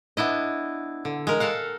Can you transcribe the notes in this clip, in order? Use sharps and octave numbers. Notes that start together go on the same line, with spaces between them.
B3 D4 E4 D#5
D3
G#3 A#4
A4 A#4 F5 F#5